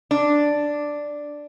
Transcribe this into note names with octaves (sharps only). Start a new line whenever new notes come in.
D4